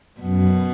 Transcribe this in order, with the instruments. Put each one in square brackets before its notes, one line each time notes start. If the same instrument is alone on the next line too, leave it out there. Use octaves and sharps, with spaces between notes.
[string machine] F#2 [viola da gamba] B2